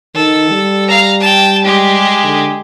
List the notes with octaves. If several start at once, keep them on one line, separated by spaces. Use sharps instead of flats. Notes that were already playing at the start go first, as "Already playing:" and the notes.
D#3 A4
G3
F5 A#5
G5 A5
G#3 G4
D3